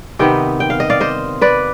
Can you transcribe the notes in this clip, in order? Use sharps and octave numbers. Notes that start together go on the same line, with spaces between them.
C3 D#3 B3 D#5 G5
G5
F5
D#5
D5 F5
C5 D#5
B4 D5